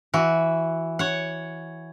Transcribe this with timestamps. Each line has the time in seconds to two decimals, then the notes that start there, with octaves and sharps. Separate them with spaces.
0.14 E3 F#4
0.99 C#5 F#5